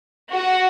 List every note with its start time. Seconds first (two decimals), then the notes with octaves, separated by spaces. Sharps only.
0.31 F#4